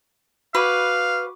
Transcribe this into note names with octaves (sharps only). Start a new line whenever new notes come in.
F#4 B4 F5 B5 D6